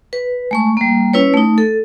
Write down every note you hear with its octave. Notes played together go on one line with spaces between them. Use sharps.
B4
G#3 A3 C#6
G3 A#3
C#4 E4 B4 C#5
A3 D#4
A4